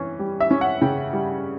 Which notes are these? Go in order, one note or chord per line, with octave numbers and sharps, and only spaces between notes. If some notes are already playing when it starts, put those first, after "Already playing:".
Already playing: E3 C#4
G3
E5
C#4
F#5
C#3 G5
G3